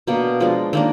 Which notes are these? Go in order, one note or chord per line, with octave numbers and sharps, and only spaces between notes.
B2 A#3 D4
F3 G#3 D4
D#3 A#3 D4